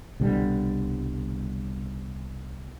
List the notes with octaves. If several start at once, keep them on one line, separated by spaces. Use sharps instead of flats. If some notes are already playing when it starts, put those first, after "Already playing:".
C2 B2 D3 G3